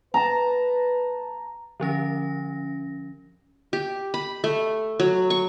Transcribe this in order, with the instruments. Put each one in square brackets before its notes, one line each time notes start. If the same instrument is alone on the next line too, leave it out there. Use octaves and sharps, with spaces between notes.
[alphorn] B4 [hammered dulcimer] A5 A#5
[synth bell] D3 F3 C#4 A#6
[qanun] G4
B5
A3
F#3
C#6